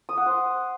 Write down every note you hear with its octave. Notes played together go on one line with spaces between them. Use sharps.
D#6
F#5
C5